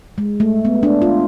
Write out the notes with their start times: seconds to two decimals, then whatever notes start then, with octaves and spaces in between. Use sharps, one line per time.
0.18 G#3
0.40 A3
0.65 B3
0.83 D4
1.02 F4